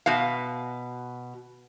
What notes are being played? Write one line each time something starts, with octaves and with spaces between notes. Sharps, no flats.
B2 F5